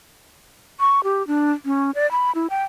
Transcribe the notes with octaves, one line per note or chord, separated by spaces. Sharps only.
C#6
G4
D4
C#4
D5
B5
E4
G5